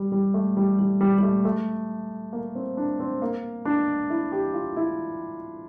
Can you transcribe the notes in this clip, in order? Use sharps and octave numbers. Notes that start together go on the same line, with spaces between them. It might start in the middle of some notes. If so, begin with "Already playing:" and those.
Already playing: G3
G3
A3
G3
G3
G3
G3
A3
A3
A#3
C4
D4
C4
A#3
D4
E4
G4
F4
E4